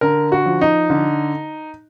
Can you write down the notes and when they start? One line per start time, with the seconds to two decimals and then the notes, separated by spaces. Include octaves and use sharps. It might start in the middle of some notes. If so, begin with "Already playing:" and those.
0.01 D3 A#4
0.32 F#4
0.46 F3
0.61 D#4
0.90 D3